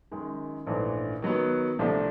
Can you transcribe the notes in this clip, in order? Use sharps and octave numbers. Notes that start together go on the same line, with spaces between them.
F#2 D#3 G#3
A#1 G#2 E3 A3 D4
D#3 F#3 B3
C2 C3 F3 A3 D4